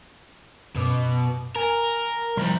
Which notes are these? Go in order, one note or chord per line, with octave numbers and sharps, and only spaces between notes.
F#2 B2 D6
A#4 G#5
C2 F3 G3 A#5